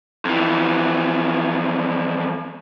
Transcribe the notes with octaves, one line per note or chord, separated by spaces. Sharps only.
F2 E3